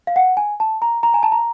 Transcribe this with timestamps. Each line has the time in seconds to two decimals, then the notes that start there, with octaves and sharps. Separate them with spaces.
0.07 F5
0.16 F#5
0.37 G#5
0.60 A5
0.82 A#5
1.03 A#5
1.14 G#5
1.23 A5
1.32 A#5